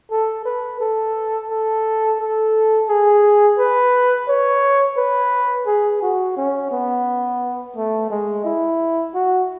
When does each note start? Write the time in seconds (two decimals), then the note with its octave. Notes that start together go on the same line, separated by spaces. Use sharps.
0.11 A4
0.45 B4
0.80 A4
1.49 A4
2.20 A4
2.88 G#4
3.58 B4
4.28 C#5
4.97 B4
5.67 G#4
6.02 F#4
6.36 C#4
6.71 B3
7.76 A3
8.10 G#3
8.44 E4
9.15 F#4